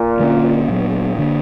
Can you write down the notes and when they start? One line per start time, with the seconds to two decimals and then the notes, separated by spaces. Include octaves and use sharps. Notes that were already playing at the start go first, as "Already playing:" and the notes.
Already playing: A#2
0.19 D3 F#3 A#3 C#4
0.69 A#2 F#3 B3 D4
1.18 D3 A#3 D4